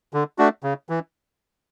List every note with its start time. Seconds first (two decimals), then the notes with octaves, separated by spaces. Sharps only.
0.14 D3
0.38 A3 D4 F#4
0.63 C#3
0.89 E3